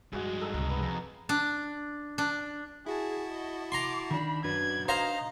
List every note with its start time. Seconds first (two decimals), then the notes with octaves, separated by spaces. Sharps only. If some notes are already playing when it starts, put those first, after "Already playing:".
0.13 G2 F3 G#3 F#4 G#4
0.41 D#4 G#4 A4
0.54 C#2 C3
0.70 B3
0.82 F2 A#5
1.29 D4
2.18 D4
2.86 E4 F#4 G#4 A5
3.28 D#5
3.72 A#5 C6 D6
4.11 D#3 D4 B5
4.44 F#2 D4 F#4 B4 G#6
4.88 D#4 C5 D#5 F5 A#5